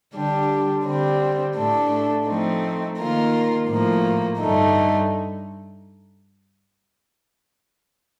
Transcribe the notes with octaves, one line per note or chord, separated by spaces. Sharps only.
D3 G3 D4 G4
D3 G3 C4
A2 A3 D4 A4
F3 A3 C4 D#4
D#3 A#3 F4 A#4
A2 F3 A#3
G2 D3 A3 D#4